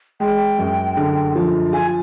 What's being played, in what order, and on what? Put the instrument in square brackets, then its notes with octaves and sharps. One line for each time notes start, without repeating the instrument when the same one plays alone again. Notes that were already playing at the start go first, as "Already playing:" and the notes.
[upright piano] G#3 [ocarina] G5
[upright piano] F#2
D3
F3
[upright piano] F4 [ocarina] G#5